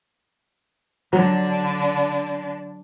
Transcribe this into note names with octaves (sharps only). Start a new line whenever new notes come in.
D3 F#3 D4